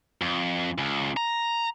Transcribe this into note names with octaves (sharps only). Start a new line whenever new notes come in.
F2
C#2
A#5